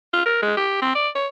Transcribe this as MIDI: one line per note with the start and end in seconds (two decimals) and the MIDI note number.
0.13 0.26 65
0.26 0.38 70
0.42 0.57 56
0.57 0.79 67
0.82 0.93 60
0.95 1.08 74
1.15 1.27 73